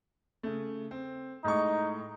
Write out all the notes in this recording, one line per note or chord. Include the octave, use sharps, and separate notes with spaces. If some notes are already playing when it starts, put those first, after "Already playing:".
C#3 A3
C4
A2 G#3 D#4 C#6